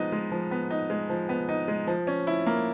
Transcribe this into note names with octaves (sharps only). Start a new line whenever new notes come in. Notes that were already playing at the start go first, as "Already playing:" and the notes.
Already playing: F3 G#3 B3 D#4
G#3
F3
B3
D#4
G#3
F3
B3
D#4
G#3
F3
C#4
E4
A#3